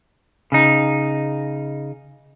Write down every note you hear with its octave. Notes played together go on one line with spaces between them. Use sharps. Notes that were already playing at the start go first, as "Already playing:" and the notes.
C#3 D#4